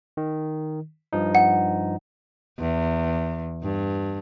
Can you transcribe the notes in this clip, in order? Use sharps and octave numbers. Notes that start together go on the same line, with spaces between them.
D#3
G2 F3 D#4
F#5
E2
G2